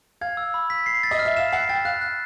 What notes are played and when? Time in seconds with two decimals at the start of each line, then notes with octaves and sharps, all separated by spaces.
0.21 F5 G#6
0.37 E6
0.54 B5
0.70 B6
0.86 C7
1.03 A6
1.11 D#5
1.19 F6
1.25 E5
1.37 F5 E7
1.52 F#5 C7
1.69 G5 A6
1.85 F5 F#6
2.01 F#6